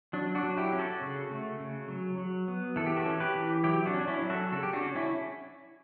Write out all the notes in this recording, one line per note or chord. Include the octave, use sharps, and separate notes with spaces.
F#3 D4
D4 F#4
F#3
E4 G4
C#4
F#4 A4
C#3
A3
C#3
F#3
F#3
B3
E3 A4
G4
F#4 A4
C#4
G4 B4
E3
F#3 E4 G4
D4 F#4
C#4
D4
C#4 E4
F#3
F#4 A4
C#3 A4
G4
D4 F#4
C#4
C#4 E4